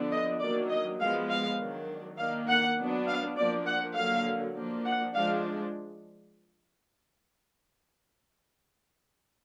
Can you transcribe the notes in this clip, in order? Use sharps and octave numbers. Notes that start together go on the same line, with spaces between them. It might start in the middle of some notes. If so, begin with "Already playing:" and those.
Already playing: D3 F3 B3 D4
D#5
D#3 F#3 A#3 D4 D5
D#5
F3 G#3 B3 F5
F5
D#3 F#3 D4
D#3 A#3 D4 F5
F#5
F#3 B3 D4
F5
F3 A#3 D4 D5
F#5
D3 F#3 A#3 F5
F3 A#3 D4
F#5
F3 G#3 D4 F5